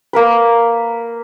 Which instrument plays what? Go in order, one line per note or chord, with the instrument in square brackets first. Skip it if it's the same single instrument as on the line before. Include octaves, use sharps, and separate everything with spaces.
[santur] A#3 A#4 B4